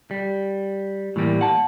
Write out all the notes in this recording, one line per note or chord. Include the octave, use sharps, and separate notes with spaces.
G3
A2 E3 G3 A#3
F#5 A5